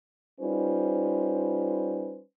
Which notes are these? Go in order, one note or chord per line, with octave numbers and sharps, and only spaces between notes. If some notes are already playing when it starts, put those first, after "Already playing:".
G3 C#4 D#4 F4 B4 C5